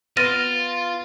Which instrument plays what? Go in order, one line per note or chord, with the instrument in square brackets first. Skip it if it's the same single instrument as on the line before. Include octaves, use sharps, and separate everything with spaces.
[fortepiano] B3 [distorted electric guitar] F4 [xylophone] F6 A#6 D#7 [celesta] A6 D7